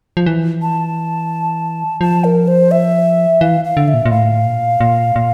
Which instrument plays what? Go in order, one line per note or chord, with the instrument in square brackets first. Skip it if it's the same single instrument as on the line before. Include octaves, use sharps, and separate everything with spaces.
[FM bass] F3
E3
[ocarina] A5
[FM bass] F3 [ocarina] A5
[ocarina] A#4
C5
E5
[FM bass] E3 [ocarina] F5
[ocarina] F5
[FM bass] D3
[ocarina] E5
[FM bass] A#2
A#2
[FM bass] A2 [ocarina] F5
[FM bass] A#2
A#2
A#2